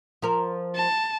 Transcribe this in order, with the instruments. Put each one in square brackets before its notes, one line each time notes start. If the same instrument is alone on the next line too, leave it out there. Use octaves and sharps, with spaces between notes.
[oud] F3 A#4
[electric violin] A5